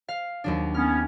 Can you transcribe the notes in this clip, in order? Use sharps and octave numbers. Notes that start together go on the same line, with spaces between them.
F5
D#2 F#3 D4
B3 C#4 F6